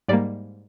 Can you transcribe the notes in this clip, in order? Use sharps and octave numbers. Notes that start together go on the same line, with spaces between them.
G#2 G3 A#3 D5